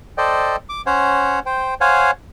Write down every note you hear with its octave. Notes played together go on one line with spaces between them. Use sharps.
A4 C5 D5 D#5 G5
D6
C#4 C5 C#5 F#5
C5 G5
C5 C#5 F5 F#5 G#5